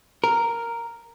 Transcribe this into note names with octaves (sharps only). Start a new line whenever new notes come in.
A#4